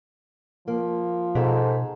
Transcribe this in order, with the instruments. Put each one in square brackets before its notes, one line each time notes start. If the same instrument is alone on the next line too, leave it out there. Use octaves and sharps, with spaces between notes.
[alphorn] F3 [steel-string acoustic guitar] A#3
[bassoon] G#2 [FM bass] B2 [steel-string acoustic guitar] G4 A4